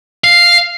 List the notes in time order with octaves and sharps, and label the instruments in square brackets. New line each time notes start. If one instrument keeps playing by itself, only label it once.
[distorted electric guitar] F5